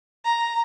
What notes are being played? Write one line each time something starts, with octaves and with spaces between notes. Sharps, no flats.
A#5